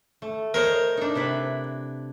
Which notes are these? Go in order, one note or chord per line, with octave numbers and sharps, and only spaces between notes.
A3
A#4 C5 C#5 D#5
D4 D#4
C3 E4 B4